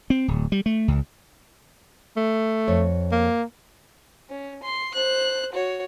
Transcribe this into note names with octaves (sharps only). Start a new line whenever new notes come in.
C4
D1
G3
A3
C#2
A3
F2 C#5
A#3
C#4
C6
C5 F#6
F#4 C#5